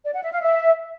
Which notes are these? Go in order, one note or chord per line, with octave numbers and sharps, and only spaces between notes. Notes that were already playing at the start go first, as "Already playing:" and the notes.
D5
F#5
E5
F5
E5